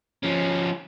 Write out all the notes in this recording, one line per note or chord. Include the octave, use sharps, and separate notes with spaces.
F3 C#4